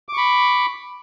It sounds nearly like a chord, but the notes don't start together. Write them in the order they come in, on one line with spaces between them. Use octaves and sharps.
D6 C#6 B5